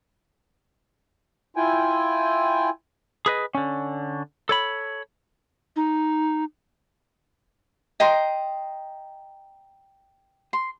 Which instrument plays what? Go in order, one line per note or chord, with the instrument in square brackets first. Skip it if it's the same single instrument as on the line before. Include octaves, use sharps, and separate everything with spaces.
[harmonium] E4 F4 G5 G#5
[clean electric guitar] G#4 B4 D#5
D3 C#4
A4 C#5 B5
[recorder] D#4
[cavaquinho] D#5 G5 A#5 C6
C6